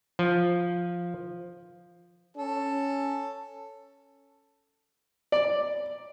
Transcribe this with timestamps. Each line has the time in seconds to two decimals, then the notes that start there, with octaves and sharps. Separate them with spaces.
0.19 F3
2.37 C#4 A4
5.32 D5